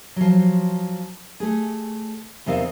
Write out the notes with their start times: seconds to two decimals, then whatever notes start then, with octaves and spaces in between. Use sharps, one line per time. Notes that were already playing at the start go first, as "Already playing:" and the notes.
0.16 F3 F#3
1.40 A3 G#4
2.46 E2 C3 D#4 A#4 D#5 F5